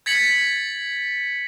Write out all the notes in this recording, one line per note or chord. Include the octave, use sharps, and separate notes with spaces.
G#6 A6 B6 C#7 F#7